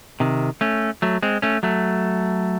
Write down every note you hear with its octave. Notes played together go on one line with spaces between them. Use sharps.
C3 D#3
A3 C#4
F#3 A3
G#3 C4
A3 C#4
F#3 A3